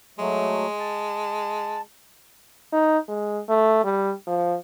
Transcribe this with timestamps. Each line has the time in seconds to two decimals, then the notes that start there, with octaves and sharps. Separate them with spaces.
0.19 F#3 G#3 A3
0.79 A5
2.72 D#4
3.08 G#3
3.49 A3
3.84 G3
4.27 F3